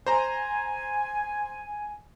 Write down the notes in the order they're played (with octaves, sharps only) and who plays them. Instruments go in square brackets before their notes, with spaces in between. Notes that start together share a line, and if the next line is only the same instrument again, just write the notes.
[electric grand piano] C5 A#5 [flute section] G#5